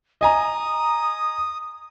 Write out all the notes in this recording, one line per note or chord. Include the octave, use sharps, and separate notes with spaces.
D#5 G#5 A#5 D#6